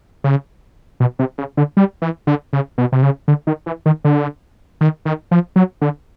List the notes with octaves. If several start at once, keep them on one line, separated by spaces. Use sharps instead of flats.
C#3
B2
C3
C#3
D3
G3
E3
D3
C#3
B2
C3
C#3
D3
D#3
E3
D#3
D3
D#3
D#3
F3
F#3
D3